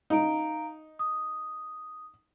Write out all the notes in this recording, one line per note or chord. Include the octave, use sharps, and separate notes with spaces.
D#4 F5 A#5 D7
D#6